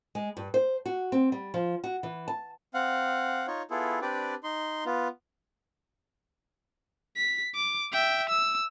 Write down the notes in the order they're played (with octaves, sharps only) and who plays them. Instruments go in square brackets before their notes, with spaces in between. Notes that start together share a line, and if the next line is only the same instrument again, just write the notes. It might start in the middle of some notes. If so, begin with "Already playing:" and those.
[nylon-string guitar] G#3
G2
C5
F#4
C4
G3
F3
F#4
E3
A5
[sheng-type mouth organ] C4 F5 F#5
D#4 F4 C#5
B3 E4 F4 G#4 A4
C4 D4 G4 B4 D5
D#4 C6
B3 F4
[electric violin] B6
D6
E5 G5
E6